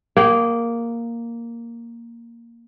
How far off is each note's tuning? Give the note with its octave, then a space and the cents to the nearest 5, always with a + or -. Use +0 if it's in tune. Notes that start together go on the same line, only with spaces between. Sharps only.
A#3 +0 G#4 -15 G5 -35